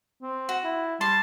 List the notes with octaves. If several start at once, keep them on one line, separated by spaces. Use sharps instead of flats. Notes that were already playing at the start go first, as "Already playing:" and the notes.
C4
F#4
E4
G3 A5 C6